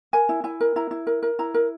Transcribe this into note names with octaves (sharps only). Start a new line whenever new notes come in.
A#4 G#5
E4
E4 G#5
A#4
E4 A#5
E4
A#4
A#4
E4 A#5
A#4